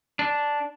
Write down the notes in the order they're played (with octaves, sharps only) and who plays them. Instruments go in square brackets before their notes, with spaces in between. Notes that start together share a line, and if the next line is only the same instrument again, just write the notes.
[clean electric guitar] D4